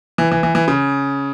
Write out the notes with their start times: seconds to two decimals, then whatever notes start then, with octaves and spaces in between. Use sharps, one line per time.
0.18 E3
0.32 E3
0.43 E3
0.55 E3
0.68 C#3